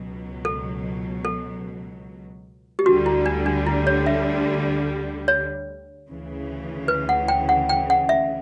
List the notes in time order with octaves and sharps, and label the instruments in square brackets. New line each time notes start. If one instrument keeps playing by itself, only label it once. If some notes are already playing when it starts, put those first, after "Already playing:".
Already playing: [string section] C#2 B2 F#3
[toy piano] A4
A4
G4
[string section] D2 D3 G3 [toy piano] F#4
[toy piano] E4
D4
D4
E4
C#5
E5
C#5
[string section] D2 C#3 E3
[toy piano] B4
F#5
G5
F#5
G5
F#5
E5